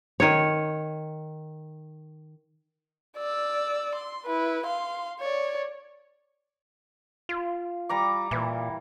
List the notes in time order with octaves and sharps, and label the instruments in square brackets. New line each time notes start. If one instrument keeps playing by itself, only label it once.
[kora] D#3 C#5
[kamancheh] D5 E6
C6
E4 B4
F5 C6
C#5 D5
[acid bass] F4
[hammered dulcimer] G3 A#5 D6
[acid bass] A#2 [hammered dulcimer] E3